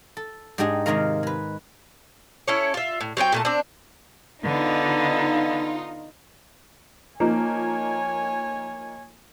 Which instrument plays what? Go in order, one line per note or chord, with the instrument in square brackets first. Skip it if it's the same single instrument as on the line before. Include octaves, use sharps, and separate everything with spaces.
[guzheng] A4
G#2 D4 D#4 G4 G#4 D#5
C3 D#3 G#3 A#4 D#5 F5
G#3 B4
[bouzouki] C#4 E4 A4 C#5
F4 E5
A2
F#3 C4 D#4 G5
A#2 A3 A5
C4 D4
[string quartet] D3 B3 [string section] D#4 F4
[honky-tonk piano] F3 A#3 D#4 [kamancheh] C#5 G#5